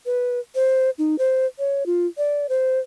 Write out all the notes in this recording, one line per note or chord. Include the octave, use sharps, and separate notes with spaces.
B4
C5
D#4
C5
C#5
F4
D5
C5